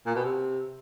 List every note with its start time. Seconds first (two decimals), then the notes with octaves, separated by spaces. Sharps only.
0.06 A#2
0.15 B2
0.25 C3